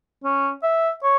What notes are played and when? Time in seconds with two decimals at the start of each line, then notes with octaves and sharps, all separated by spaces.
0.24 C#4
0.63 E5
1.04 C#5